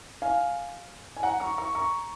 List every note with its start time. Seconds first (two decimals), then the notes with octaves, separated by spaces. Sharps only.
0.22 F5 G#5
1.17 G#5
1.23 F#5 A#5
1.40 A#5 C#6
1.58 A#5 C#6
1.75 A#5 C#6